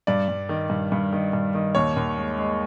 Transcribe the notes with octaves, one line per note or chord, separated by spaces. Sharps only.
G2 D5
G2
D#3
G2
G2
D#3
G2
D#3
D#2 C#5
D#2
G#3
G#3